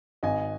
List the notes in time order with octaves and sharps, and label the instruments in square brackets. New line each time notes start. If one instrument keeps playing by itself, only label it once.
[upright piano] G#1 D#5 G#5